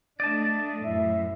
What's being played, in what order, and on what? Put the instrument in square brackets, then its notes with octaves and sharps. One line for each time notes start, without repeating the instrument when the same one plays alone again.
[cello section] A3 D4 [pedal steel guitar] D5 D#5 A5
[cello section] F#2 A2 [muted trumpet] E5